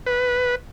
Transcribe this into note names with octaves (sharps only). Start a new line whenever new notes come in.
B4